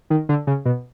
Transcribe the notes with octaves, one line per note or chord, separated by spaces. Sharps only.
D#3
D3
C#3
B2